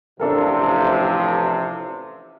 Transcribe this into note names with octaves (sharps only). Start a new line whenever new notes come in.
A1 C3 F3 D4 A4 A#4